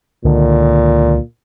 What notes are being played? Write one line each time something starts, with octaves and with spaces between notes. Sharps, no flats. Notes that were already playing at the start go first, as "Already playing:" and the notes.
C#2 A#2 D3 D#3